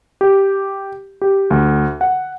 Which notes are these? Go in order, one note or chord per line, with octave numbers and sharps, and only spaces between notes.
G4
G4
D2
F#5